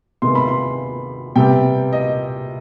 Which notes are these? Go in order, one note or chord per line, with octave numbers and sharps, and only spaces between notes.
C3 D#3 G#3 B3 C6
B5
C6
C3 G3 B3 G5
D#5